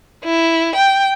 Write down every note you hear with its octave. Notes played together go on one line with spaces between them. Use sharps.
E4
G5